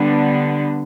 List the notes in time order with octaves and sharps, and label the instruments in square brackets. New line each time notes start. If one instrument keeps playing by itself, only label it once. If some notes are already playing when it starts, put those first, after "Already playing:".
Already playing: [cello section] D3 G3 B3 D4